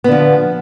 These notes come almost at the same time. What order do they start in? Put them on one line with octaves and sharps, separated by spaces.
B3 D3 F3